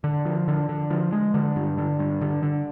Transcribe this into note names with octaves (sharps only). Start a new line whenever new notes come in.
D3
F3
D3
D3
F3
G#3
D3
G2
D3
G2
D3
D3